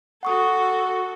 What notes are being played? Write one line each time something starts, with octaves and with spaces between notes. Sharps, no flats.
F#4 A4 F#5 C#6 D#6